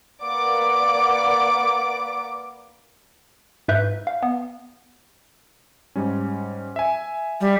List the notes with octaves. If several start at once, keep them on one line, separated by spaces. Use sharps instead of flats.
A#3 B4 D5 F#5 D6 D7
G#2 B4 E5 F#6 G6
F5
B3
G#2 G3 C#4
E5 G#5
G3